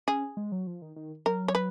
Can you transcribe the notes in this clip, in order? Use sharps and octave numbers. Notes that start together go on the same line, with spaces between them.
C#4 G#4
G#3
F#3
F3
D#3
D#3
F#3 A#4
C#5
B4